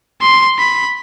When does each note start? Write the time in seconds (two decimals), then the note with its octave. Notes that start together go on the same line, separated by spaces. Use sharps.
0.21 C6
0.59 B5